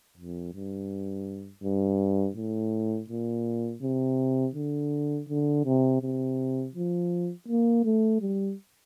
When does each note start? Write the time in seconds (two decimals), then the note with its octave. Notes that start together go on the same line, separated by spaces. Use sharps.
0.17 F2
0.54 G2
1.63 G2
2.36 A2
3.10 A#2
3.82 C3
4.55 D3
5.29 D3
5.65 C3
6.02 C3
6.75 F3
7.48 A#3
7.84 A3
8.21 G3